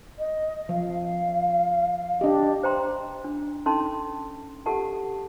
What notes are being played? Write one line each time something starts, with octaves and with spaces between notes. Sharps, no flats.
D#5
F3 F5
D4 G4 D#5
C5 G5 A#5 C6
D4
C#4 D#4 A4 A5 C6
G4 A4 F#5 A5